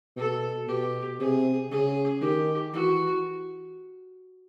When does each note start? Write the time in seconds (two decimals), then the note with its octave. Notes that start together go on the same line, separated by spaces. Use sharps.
0.16 B2 A4
0.68 B2 G4
1.20 C3 G#4
1.71 C#3 G#4
2.22 D#3 G4
2.73 E3 F#4